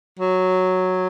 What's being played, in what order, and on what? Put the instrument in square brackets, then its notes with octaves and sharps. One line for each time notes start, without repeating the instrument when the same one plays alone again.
[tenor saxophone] F#3